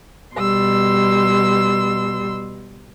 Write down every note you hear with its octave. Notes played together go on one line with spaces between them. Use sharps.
B2 G3 C6 E6